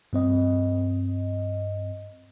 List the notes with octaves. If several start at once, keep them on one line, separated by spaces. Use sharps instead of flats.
G2 C4 D#5